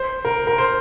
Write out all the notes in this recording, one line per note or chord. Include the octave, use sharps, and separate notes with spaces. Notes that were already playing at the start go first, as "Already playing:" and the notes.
Already playing: C5
A#4
A#4
C5